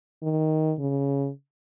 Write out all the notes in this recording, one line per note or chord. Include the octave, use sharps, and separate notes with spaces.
D#3
C#3